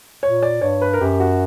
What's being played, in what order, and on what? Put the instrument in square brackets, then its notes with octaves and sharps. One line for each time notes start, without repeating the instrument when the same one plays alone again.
[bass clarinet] A#2 [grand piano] C#5
[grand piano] D5
[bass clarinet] G2 [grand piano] C#5
[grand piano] B4
A#4
[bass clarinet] F#2 [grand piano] G4
[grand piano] F#4